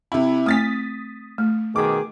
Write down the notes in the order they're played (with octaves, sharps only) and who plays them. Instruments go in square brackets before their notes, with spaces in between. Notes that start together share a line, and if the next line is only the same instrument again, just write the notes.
[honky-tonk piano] C3 E4
[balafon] A3 C4 [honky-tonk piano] D#6 A6 B6
[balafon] A3
[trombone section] B2 D#3 G#4 [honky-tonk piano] D6